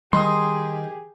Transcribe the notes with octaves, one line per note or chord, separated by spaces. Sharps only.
D#3 G3 G4 G#4 C6 D#6